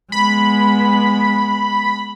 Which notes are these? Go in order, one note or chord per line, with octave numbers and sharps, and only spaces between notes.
G#3 B3 B5